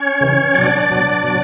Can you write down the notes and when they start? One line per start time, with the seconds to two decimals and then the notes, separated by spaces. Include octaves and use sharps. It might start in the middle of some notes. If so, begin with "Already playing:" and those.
Already playing: C#4 C#5
0.21 C#3 E3
0.54 B2 F#3 D4 D5
0.89 B2 F#3
1.24 B2 F#3